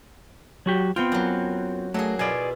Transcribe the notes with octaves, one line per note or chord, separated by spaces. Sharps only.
F#3 F#4 G4
B3 C4 F4 G5
F#2 F#3
F#3 A3 A#3 G#4
B2 E4 F4 G#4 D5